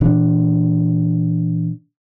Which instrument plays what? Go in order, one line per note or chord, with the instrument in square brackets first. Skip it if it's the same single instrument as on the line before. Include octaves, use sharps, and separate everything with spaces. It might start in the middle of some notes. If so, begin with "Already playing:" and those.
[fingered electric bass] A#2 E3 D4